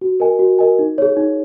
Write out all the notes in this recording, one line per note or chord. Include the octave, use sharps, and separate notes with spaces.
F#4
A#4 D#5 G#5
F#4
A#4 D#5 G#5
D#4
G#4 C#5
D#4